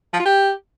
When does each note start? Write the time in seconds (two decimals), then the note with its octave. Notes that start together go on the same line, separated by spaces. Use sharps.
0.13 F3
0.19 F4
0.25 G4